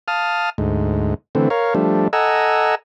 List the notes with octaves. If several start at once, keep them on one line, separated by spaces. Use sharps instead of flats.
F5 A5 D#6 F6
D2 G#2
D3 E3 A3 C4
A#4 C#5 F5
F3 G3 A3 D4
A4 D#5 F#5 G#5 A#5 E6